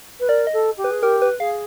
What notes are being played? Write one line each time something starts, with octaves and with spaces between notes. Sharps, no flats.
B4
A#4 D5
D#5
A4
G4
B4
G#4
G4 A#4
B4
G#4 F5